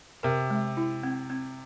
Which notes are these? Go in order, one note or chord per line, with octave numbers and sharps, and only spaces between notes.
C3 A#4
G#3
E4
C4
C4